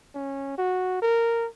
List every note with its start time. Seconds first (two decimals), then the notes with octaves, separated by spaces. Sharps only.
0.15 C#4
0.58 F#4
1.02 A#4